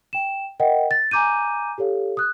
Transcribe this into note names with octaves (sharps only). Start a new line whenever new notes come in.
G5 E7
A#4 D#5 F#5 G5
A6
G#5 A#5 D6 G6 D#7
G4 A4 C#5 F5
D#6 F#6